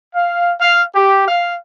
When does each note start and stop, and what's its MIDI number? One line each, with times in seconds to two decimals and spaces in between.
0.15 0.51 77
0.60 0.82 77
0.94 1.25 67
1.27 1.56 77